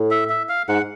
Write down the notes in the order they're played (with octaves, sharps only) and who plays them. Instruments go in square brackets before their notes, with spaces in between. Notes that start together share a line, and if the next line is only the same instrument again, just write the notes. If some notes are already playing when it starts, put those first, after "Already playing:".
Already playing: [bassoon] A2
[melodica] E5
E5
F5
[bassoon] G#2 [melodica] F#5